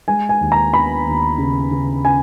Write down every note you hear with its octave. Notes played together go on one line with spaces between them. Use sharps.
G#3 G#5
G#5
D#2
A#5
B3 B5
D#2
C#3
C#3
C#3 G#5